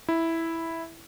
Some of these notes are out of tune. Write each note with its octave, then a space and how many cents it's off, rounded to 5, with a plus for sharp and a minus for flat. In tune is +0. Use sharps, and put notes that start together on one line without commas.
E4 -5